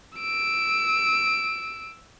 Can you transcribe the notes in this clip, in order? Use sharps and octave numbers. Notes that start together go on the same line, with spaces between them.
E6 D7